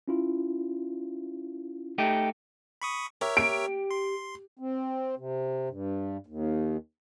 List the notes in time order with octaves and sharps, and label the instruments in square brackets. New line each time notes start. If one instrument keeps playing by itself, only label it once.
[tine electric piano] C#4 E4 F4
[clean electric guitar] A3 D#4 G4
[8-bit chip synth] B5 C#6 D#6
[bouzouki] G4 [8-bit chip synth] A#4 C#5 E5
[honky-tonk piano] D7
[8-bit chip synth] C6
[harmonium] C4
C3
G2
D#2